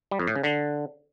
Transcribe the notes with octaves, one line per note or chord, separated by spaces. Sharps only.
G3
F2
A2
C#3
D3